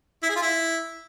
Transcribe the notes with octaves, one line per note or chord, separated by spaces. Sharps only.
E4
G#4
F4
E4